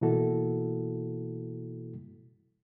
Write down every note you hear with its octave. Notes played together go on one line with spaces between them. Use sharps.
B2 E3 A#3 E4 F#4 A4